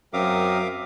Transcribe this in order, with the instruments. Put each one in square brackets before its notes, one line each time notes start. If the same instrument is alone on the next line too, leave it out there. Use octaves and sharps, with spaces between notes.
[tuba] F#2 [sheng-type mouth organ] C4 A#4 D#6 [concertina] E5 F5 D6